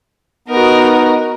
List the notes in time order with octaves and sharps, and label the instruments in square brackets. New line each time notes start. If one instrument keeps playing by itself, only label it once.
[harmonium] B3 D#4 [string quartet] F#4 A#4 D#5